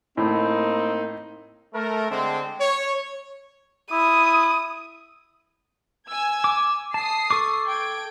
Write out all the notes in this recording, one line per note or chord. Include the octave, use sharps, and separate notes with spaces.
A2 A#3 C4 D#4
A3 A#4
D3 G#3 C4
C#5
E4 D#6
G#5 E6 G#6
D6
A5 D#6 C7
A4 C#6 D6
G5 G#6 D7